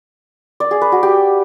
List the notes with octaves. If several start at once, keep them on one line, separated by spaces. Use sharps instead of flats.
D5
G#4
B4
F#4
G4